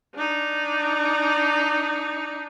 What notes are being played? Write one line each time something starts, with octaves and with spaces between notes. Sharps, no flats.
D4 D#4